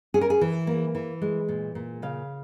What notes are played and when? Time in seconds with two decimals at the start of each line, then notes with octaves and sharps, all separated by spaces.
0.14 C#4 G#4
0.21 A#4
0.30 G#4
0.41 E3
0.67 A#3
0.95 E3
1.22 G#3
1.49 A#2
1.75 A#2
2.02 C#3 F5